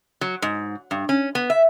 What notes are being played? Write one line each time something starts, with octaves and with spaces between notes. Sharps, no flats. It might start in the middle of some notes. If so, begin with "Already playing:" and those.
F#3
G#2
G2
C#4
B3
E5